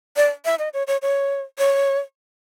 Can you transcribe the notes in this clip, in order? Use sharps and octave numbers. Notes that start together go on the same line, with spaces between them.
D5
E5
D#5
C#5
C#5
C#5
C#5